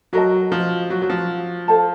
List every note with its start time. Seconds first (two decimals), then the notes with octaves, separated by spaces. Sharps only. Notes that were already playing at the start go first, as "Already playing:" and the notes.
0.13 F#3 F#4 A#4 D#5 A5
0.52 F3
0.90 F#3
1.02 F#3
1.10 F3
1.68 A4 C5 F5 A5